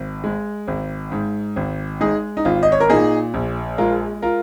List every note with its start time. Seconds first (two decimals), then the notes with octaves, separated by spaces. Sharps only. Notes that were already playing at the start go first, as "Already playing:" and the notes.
Already playing: G#1
0.24 G#3
0.68 G#1
1.12 G#2
1.56 G#1
2.01 G#3 D#4 G#4
2.37 D#4
2.45 G#1 F4
2.63 D#5
2.72 C#5
2.80 A#4
2.90 A#2 D#4 G#4
3.34 A#1
3.78 G#3 F4 A#4
4.22 F4 A#4